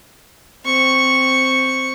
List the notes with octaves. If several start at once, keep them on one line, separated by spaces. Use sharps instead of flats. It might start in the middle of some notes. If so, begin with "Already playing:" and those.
C4 C#6